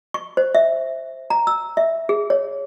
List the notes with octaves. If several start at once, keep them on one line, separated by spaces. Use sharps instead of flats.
C#6
C5
E5
A#5
E6
E5
G#4
C#5